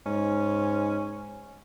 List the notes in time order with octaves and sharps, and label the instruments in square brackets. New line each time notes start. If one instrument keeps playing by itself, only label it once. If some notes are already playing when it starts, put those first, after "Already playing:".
[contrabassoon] G#2 [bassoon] C#4